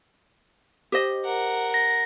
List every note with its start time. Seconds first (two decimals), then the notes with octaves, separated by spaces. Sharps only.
0.92 G4 C5 D#5
1.25 A#4 F#5
1.74 A#6